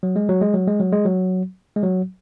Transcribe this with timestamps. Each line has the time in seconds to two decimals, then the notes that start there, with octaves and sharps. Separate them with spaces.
0.03 F#3
0.16 G#3
0.29 F#3
0.41 G#3
0.54 F#3
0.67 G#3
0.80 F#3
0.92 G#3
1.05 F#3
1.76 G#3
1.83 F#3